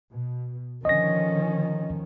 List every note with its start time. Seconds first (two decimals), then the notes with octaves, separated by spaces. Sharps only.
0.13 B2
0.85 D3 D#3 F3 C#4 D#5 A#6